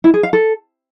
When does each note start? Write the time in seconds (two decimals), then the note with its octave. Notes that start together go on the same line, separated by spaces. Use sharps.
0.04 E4
0.14 G#4
0.23 F5
0.33 A4